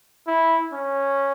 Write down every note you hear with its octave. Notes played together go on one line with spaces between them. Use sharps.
E4
C#4